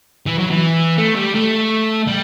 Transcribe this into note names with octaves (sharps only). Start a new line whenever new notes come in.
E3
F#3
E3
A3
G3
A3
G3